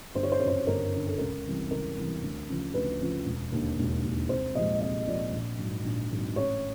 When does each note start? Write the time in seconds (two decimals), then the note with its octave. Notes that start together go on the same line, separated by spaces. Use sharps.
0.15 G1 C5
0.23 C#5
0.32 C5
0.40 F#2 D3 C#5
0.48 C5
0.67 G1 A#4
0.92 F#2 D3
1.07 A4
1.18 C#2 A#4
1.45 C3 E3 G3
1.70 C#2 A#4
1.96 C3 E3 G3
2.22 D2
2.49 C#3 F3
2.74 D2 B4
3.00 C#3 F3
3.25 E1
3.52 D#2 D3
3.78 E1
4.03 D#2 D3
4.29 C2 C5
4.55 A#2 F3 G#3 D#5
4.81 C2 D#5
5.06 A#2 F3 G#3 D5
5.32 A#1
5.58 G#2 D#3 F#3
5.84 A#1
6.10 G#2 D#3 F#3
6.36 A1 C#5